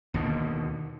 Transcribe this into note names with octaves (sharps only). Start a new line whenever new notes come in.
D#2 B2 D3